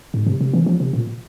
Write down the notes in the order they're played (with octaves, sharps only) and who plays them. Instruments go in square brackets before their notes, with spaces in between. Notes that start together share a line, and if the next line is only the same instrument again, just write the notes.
[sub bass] G#2
C3
C3
E3
F3
C3
A#2